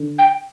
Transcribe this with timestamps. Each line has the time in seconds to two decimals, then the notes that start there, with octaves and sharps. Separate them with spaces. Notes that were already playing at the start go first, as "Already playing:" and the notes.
Already playing: D3
0.19 G5